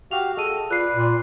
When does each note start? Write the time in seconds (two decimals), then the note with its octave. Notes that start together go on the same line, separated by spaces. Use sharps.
0.11 F#4 G4 F5 F7
0.37 G#4 A4 D#5 D#7
0.71 F4 B4 D5 F#6 C7
0.92 A#2